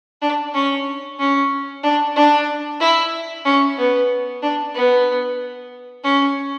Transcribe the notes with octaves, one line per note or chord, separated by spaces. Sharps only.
D4
C#4
C#4
D4
D4
E4
C#4
B3
D4
B3
C#4